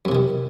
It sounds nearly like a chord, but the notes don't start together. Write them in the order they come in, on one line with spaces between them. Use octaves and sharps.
F#2 C3 E3 D#3